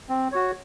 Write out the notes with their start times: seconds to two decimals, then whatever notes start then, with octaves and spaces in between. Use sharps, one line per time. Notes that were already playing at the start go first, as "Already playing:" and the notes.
0.09 C4
0.32 F#4 C#5